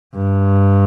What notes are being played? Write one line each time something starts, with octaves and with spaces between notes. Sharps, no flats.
G2